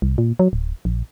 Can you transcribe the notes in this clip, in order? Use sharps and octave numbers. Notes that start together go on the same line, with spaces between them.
C2
A#2
F#3
D1
A#1